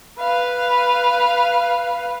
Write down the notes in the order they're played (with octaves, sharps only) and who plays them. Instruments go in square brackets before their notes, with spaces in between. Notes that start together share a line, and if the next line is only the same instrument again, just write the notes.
[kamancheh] B4 F5